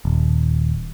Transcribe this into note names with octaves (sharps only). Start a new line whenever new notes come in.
D#1